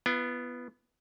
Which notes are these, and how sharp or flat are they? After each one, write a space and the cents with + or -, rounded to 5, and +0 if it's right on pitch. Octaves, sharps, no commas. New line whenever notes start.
B3 +0 F4 -40